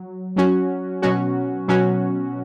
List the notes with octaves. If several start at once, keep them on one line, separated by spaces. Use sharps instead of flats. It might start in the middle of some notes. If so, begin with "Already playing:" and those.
Already playing: F#3
F#3 C#4 F#4
B2 F#3 C#4 F#4
B2 F#3 C#4 F#4